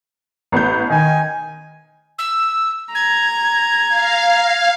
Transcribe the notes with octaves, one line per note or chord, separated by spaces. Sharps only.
A1 B3 G6
D#3 G#5
E6
A#5 G#6
F5